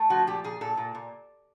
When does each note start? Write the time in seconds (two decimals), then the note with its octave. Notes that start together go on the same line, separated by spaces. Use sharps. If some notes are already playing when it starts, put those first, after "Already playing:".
Already playing: A3
0.10 F3 F#4
0.27 A#2 G4
0.44 A#2 G#4
0.61 A#2 A4
0.77 A#2
0.95 A#2